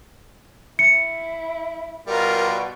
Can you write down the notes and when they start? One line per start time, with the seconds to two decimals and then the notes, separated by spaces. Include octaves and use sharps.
0.79 E4 C#7
2.07 B2 G3 F4 A#4